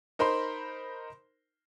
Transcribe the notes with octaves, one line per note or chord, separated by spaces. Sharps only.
D#4 A#4 C5 B5 C6